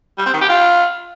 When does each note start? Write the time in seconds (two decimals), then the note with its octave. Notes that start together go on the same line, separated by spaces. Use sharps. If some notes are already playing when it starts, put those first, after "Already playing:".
0.18 G3
0.26 C4
0.33 D#3
0.41 G4
0.49 F4